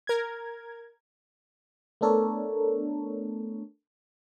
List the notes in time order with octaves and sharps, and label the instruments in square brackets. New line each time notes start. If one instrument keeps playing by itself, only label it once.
[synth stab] A#4 G#6
[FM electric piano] A3 B3 D4 A4 A#4 C#5